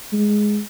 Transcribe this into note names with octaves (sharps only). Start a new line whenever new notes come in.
G#3